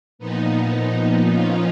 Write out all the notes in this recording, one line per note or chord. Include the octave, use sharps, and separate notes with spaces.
A#2 F3 B3 D#4
C#4 F4